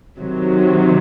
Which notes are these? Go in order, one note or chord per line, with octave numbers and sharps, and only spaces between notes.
C3 D#3 F#3